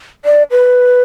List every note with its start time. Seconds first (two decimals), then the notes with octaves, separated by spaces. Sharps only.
0.25 D5
0.51 B4